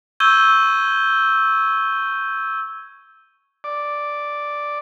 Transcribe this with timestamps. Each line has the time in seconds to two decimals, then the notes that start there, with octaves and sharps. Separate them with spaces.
0.20 C#6 E6 G6 G#6 D#7 G7
3.64 D5